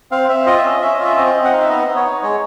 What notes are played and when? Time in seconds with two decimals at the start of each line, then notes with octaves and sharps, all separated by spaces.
0.11 C4 F5
0.29 C4 E5
0.46 F4 D#5
0.58 E5
0.64 C#4
0.70 D#5
0.82 C#4 E5
0.94 D#5
0.99 F4
1.04 E5
1.16 C4 D#5
1.35 C4
1.45 F#5
1.52 D#4 F5
1.61 E5
1.70 B3 D#5
1.87 B3
1.96 C#5
2.05 D#4
2.22 G#3 C#5